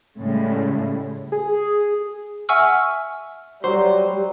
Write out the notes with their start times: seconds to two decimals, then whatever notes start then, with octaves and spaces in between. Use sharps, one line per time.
0.18 A2 C#3 G3 G#3
1.32 G#4
2.49 E5 F#5 G#5 C#6 E6 F6
3.64 F#3 G3 C5